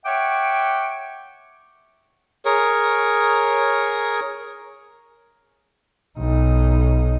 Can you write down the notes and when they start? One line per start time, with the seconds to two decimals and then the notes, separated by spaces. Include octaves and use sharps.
0.06 C#5 E5 F#5 G5 C#6 D6
2.45 G#4 A#4 C#5
6.19 B1 D#4